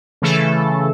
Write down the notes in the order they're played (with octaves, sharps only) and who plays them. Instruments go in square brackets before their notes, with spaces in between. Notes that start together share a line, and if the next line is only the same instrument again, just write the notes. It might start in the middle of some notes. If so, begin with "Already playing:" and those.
[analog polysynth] C#3 E3 A3 A4